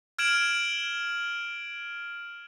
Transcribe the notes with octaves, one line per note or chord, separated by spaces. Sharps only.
F6 G#6 D7 E7 F#7